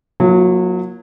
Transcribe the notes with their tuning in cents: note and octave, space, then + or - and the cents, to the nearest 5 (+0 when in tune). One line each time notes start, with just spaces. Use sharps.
F#3 -25 A#3 +15 E4 +35